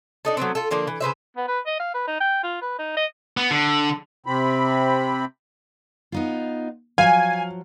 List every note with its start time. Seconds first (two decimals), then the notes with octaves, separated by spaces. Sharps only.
0.25 D4 D#4 A4
0.37 F#3 A3 B3 C4
0.55 F4 A4
0.71 D3 F3 A#3 D4
0.87 E3
1.01 C#3 B4 C5 E5
1.36 B3
1.48 B4
1.67 D#5
1.80 F5
1.94 B4
2.07 D#4
2.20 G5
2.43 F4
2.61 B4
2.79 D#4
2.97 D#5
3.37 B3
3.51 D3
4.26 C3 C4 B5
6.12 B3 D#4 F4
6.98 F3 F#3 F5 G#5